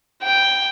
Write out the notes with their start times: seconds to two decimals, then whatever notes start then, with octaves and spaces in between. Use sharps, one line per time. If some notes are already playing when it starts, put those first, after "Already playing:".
0.23 G5